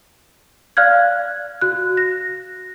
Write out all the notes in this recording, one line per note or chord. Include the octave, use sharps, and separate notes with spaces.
D5 F5 F6 F#6 G#6
F#4 F#6
A#6